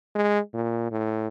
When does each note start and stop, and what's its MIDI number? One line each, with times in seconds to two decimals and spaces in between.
0.15 0.39 56
0.54 0.90 46
0.92 1.28 45